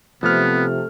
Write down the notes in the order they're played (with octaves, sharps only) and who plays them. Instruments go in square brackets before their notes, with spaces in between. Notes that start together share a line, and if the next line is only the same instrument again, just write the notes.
[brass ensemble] C3 [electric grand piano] F3 F6 [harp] A3 A4 [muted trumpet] B3